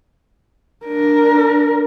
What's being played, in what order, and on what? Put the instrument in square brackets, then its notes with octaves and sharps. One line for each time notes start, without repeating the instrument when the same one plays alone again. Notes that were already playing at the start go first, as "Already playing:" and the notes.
[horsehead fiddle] D4 A#4